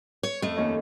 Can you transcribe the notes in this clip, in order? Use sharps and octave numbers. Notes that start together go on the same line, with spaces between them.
C#5
F2 A3
D#2 C#4 D#5